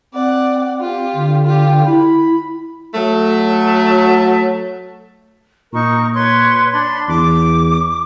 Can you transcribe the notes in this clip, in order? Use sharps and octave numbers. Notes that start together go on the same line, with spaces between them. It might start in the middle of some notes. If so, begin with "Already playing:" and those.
C4 D5 F#5
F4 G4
D3
F4 G4
E4 B5
F#3 A3
A#2 D#4 A#4 C#6
B4 C#5 C6
D4 B5 C6
E2 D6